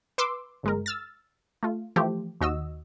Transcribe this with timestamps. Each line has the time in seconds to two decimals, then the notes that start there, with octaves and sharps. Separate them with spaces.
0.18 B4 C6 D6 E6
0.63 G1 G#3 A#4
0.86 E6 F6 A6
1.63 A3 F4
1.96 E3 F3 A3 G4 C5
2.41 D#2 F#4 D#5 E6